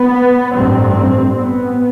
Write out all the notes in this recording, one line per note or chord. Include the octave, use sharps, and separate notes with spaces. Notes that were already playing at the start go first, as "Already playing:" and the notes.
Already playing: B3
A1 G2 C4
B3